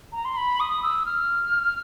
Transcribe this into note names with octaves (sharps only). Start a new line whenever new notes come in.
A#5
C6
B5
D#6
E6
F6